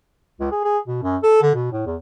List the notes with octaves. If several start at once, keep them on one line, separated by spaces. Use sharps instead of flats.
C#2
G#4
G#4
B2
F#2
A4
D3
B2
A2
E2